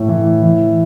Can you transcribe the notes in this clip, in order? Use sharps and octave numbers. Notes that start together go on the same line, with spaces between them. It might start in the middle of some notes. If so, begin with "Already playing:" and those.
Already playing: A2
E3
E3